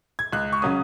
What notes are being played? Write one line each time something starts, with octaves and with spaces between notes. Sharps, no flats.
G#6
C#2 F#6
C#6
C#3 F#3 C#4 D#6